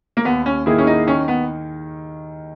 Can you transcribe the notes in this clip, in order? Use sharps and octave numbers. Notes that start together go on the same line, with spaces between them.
A#3
D#2 B3
C#4
D#3 A#3 E4 G#4
C#4
D#4
D#3 C#4
B3